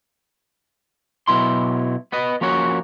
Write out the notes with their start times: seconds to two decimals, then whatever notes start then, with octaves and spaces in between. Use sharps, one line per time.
1.28 B2 F#3 E4 C6
2.12 B3 B4 D#5
2.41 F3 A#3 C#4 F#4 C#5